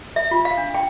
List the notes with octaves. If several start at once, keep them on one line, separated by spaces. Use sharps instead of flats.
E5
F4
F5
D4
G5